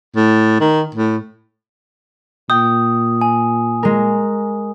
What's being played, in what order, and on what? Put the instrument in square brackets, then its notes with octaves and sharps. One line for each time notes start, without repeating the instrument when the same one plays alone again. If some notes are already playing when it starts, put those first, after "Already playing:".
[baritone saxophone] A2
D#3
A2
[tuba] A#2 [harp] G5 [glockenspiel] D#6
[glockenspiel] G#5
[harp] G#3 A#4